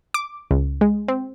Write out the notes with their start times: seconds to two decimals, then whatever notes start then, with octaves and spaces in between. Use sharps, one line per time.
0.14 D6
0.51 C#2
0.81 G#3
1.08 C4